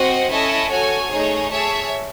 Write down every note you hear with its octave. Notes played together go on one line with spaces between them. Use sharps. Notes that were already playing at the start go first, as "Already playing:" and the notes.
Already playing: C4 F#4 C5 D#5 F#5
C#4 E4 A4 D#5 A5
F#4 A4 C#5 G#5
A3 D#4 G#4 C#5
G#4 C#5 E5 A5